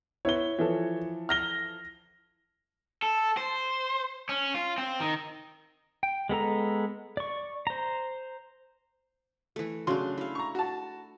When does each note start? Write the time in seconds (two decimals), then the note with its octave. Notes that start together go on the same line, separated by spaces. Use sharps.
0.25 B3 E4 C#5 G7
0.59 E3 F3 A4
1.29 F6 A#6 G7
3.03 A4
3.37 C5
4.29 C#4
4.55 F4
4.78 C4
5.00 D#3
6.03 G5
6.29 G#3 B3 A4 A#5
7.17 D5 C#6
7.67 C5 A#5
9.56 E3 A3
9.87 C#3 F#3 D4 C6
10.18 E4 F5
10.35 A#5 C#6
10.55 F#4 A5